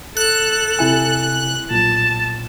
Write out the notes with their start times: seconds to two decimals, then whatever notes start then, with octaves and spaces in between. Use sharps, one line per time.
0.17 A4 F#6
0.79 C3 E4 G#5
1.71 B1 A#2 A5